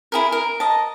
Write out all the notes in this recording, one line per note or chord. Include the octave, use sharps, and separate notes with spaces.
E4 G#4 A#4
A#4
D#5 A5